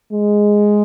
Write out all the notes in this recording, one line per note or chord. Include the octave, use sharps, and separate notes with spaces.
G#3